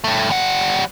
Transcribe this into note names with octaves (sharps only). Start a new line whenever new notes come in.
G2 A3
G3 F#5